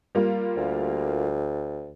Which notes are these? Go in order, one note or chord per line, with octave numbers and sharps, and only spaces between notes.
G3 A#3 F4
D2